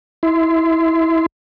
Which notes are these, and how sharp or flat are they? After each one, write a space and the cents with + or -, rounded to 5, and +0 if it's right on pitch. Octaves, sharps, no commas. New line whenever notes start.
E4 -20 C6 -30